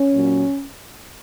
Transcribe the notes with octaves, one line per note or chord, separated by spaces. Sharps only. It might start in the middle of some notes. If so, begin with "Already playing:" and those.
Already playing: C#4
A#2 F#3